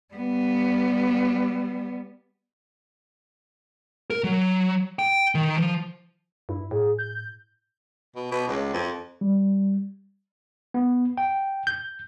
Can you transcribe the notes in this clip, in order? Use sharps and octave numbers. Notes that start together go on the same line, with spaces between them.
G3 B3
A#4
F#3
G5
D#3
F3
G2 E4
A2 G#4
G6
B2
B2
C#2
F2
G3
B3
G5
G6